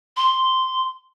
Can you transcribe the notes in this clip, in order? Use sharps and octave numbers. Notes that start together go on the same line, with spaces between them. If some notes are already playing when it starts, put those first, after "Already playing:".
C6